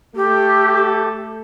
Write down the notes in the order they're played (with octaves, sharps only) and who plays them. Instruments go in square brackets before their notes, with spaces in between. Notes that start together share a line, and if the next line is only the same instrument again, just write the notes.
[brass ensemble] A3 A4 [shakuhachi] G4